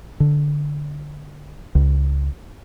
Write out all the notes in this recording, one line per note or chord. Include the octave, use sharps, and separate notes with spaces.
D3
C#2